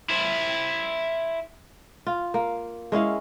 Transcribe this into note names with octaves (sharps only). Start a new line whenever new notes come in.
E4 C5
F4
A#3
G#3 C#4 E4 F5